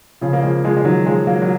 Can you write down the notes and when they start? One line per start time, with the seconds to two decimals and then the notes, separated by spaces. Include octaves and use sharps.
0.21 C#3 F3
0.33 A#3
0.43 F3 G#3
0.65 F3 G#3
0.76 G#3
0.85 D#3 F#3
1.06 F3 G#3
1.27 F#3 A#3
1.42 F#3